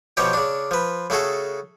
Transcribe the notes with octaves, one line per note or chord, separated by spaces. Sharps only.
B2 F3 G4 C#5 G5
C#3 D4
F3 B4
C#3 A3 F#4 G#4 A4